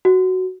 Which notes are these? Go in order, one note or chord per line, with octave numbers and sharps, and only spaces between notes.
F#4